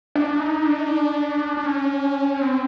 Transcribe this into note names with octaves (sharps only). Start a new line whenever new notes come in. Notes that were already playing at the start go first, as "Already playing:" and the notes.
D4
D#4
D4
D#4
D4
D4
C#4
C4